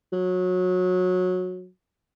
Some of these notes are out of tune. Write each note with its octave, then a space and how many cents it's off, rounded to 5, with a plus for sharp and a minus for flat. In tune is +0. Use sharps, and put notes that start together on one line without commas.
F#3 -20